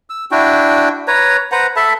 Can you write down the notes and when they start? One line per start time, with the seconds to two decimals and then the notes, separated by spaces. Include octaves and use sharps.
0.10 E6
0.31 D4 E4 F#4 G5
1.08 B4 C#5 A#5
1.52 B4 C5 F#5 A#5
1.76 A4 E5 A5 B5